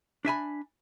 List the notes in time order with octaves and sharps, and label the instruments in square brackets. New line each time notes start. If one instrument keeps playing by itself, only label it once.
[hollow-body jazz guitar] D4 E5 G#5 B5